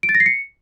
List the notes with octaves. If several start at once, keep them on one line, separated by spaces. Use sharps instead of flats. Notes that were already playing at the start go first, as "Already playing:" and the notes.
D7
A6
A#6
C7
C#7